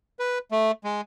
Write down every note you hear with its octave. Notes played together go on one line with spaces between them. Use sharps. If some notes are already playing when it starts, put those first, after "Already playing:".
B4
A3
G#3